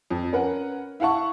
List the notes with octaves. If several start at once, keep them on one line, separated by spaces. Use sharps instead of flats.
F2
C#4 A#4 B4 F#5
E4 F5 F#5 A5 C#6